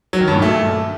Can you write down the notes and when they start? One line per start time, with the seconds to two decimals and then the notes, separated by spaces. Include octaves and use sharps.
0.13 F#3
0.20 D#3
0.28 G2
0.35 A#2
0.42 A3